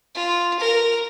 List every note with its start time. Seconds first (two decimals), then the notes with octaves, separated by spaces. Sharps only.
0.15 F4
0.59 A#4